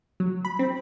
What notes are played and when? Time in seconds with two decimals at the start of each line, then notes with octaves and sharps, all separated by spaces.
0.20 F#3
0.45 B5
0.59 C4